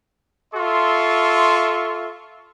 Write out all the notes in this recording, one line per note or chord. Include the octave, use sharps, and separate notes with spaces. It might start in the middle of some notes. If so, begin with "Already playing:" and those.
F4 A4 E5 C6 C#6